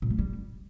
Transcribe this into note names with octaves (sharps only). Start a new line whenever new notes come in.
A#2
A#3
G3